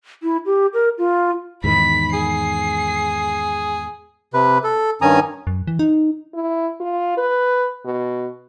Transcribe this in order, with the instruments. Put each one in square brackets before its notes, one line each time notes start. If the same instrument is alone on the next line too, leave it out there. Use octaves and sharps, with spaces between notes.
[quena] E4
G4
A#4
F4
[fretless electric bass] E2 G#2 D#3 [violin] B5 B6
[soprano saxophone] G#4 [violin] C7
[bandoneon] C3 B4
A4
G2 D#3 C#4 G#5 A#5 D#6
[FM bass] F#2
E3
D#4
[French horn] E4
F4
B4
B2